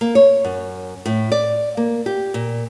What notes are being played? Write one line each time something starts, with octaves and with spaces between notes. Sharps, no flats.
A#3
C#5
F#2
A2
D5
A#3
G4
A#2